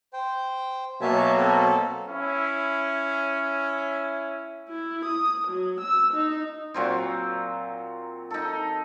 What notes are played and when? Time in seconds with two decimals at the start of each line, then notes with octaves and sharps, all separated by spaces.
0.13 C5 G5
1.01 B2 F#3 A#3 E5 G#5 A5
1.37 C4 A4
2.07 C#4 E4 E5
4.69 E4
5.05 D#6
5.48 F#3
5.81 E6
6.14 D#4
6.74 A#2 F#3 C4
8.31 D#4 A4